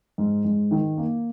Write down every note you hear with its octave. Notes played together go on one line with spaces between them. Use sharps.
G#2
G#2
D#3
A#3